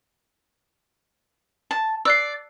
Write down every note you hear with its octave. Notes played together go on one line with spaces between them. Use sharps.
A5
D5 E6 F#6 C7